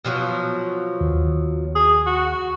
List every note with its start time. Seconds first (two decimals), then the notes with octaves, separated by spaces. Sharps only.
0.05 B2 F3 F#3
1.01 D#2
1.75 G#4
2.06 F#4